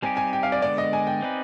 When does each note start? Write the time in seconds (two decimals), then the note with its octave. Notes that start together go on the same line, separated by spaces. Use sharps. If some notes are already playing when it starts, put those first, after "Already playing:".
0.02 G3 C4 D#4 G4 G#5
0.17 G#5
0.33 G5
0.43 F5
0.52 D5
0.62 D3 G#3 B3 D5
0.78 D#5
0.93 G#5
1.07 G5
1.22 C4 D#4 B4